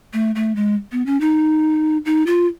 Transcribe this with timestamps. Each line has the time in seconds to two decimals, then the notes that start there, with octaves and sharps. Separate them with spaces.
0.13 A3
0.35 A3
0.56 G#3
0.92 B3
1.06 C#4
1.21 D#4
2.06 D#4
2.27 F4